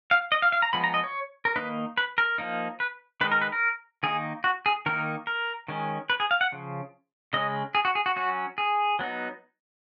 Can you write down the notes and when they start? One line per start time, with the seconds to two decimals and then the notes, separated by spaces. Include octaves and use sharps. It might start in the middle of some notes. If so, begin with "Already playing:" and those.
0.11 F5
0.32 D#5
0.42 F5
0.52 F5
0.62 A#5
0.73 F3 G#3 B3 B5
0.84 A#5
0.94 D#5
1.04 C#5
1.45 A#4
1.56 D#3 A#3 D#4 B4
1.98 B4
2.18 A#4
2.38 F3 A#3 D#4
2.80 B4
3.21 D#3 G#3 D#4 B4
3.32 A#4
3.42 B4
3.52 A#4
4.03 D#3 A#3 D#4 G#4
4.44 F#4
4.66 G#4
4.86 D#3 A#3 D#4 A#4
5.27 A#4
5.68 D#3 G#3 C#4
6.10 B4
6.20 G#4
6.31 F5
6.41 F#5
6.52 C#3 F3
7.33 C#3 G#3 C#4 D#5
7.75 G#4
7.85 F#4
7.95 G#4
8.06 F#4
8.16 F#3 C#4 F#4
8.58 G#4
8.99 F#3 B3 D#4